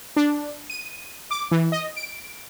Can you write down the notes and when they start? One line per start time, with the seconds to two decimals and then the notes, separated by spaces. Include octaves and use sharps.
0.16 D4
0.70 D#7
1.31 D6
1.51 E3
1.72 D#5
1.96 D7